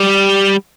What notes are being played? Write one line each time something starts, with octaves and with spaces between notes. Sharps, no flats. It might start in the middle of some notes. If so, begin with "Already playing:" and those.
Already playing: G3